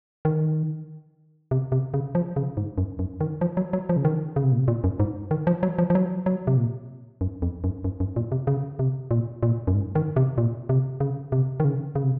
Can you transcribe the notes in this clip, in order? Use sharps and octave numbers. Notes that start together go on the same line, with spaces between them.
D#3
C3
C3
C#3
F3
C#3
G#2
F#2
F#2
D#3
F3
F#3
F#3
F3
C#3
D#3
C#3
C3
A#2
C3
A#2
F#2
G#2
D#3
F3
F#3
F3
F3
F#3
F#3
C3
A#2
F#2
F2
F#2
F#2
F#2
A#2
C3
C#3
C3
A#2
A#2
F#2
G#2
D#3
C3
A#2
C3
C#3
C3
D#3
C#3
C#3
C3